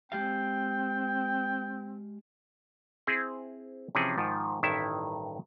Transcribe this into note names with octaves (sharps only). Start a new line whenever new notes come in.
G#3 C4 G4 F5 G5
C4 E4 G#4 C5
C3 E3 F3 C4 C#4 G#4
G#2 D#3 F3
A1 G2 D#3 E4 E5 A5